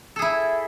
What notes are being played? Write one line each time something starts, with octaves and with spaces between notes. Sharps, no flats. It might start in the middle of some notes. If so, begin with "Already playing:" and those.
E4 G#4 A4